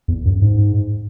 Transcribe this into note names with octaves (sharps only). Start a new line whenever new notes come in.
E2
F#2
G#2